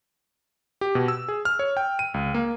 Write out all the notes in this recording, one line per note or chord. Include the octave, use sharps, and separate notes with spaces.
G4
B2
E6
G#4
F6
C#5
G5
D#7
C#2
A#3